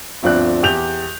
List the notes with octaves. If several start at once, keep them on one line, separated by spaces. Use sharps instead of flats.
G1 D2 F3 C4 D4 F#6
E2 G4 G6 F7